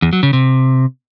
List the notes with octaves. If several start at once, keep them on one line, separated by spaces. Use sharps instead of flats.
E2
F#3
C#3
C3